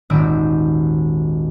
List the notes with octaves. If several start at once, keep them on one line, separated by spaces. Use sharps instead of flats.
D#1 G#1 E6 D7